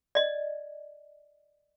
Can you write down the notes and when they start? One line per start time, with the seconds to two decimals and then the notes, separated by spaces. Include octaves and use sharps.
0.15 D5 D#5